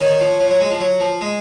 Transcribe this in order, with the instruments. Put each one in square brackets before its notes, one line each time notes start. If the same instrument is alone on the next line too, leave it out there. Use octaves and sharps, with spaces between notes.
[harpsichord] D#3 [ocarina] C#5
[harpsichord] F3
F3
F#3
G#3
F3
F#3
F3
G#3